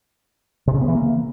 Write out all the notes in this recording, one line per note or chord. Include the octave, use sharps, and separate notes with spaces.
C3
C#3
B3
E3
A#3